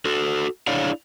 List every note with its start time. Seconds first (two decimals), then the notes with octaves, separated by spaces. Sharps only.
0.05 F#4 A4
0.67 D4 E4 G#4 C#5 D5 F5